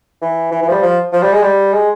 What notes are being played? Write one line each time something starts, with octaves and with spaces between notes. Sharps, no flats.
E3
E3
E3
F3
G3
F3
F3
G3
G#3
G3
G#3